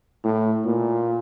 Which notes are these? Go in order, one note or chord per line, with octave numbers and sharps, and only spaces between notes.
A2
A#2